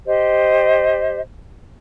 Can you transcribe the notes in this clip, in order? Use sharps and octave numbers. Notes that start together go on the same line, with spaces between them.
G4 C5 D#5